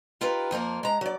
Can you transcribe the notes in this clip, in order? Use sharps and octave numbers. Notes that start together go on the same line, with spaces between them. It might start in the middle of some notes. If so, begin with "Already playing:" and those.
D#4 F4 G4 A#4 B4
F2 F3 A#3 A#4
G#3 A#5
F#3 D5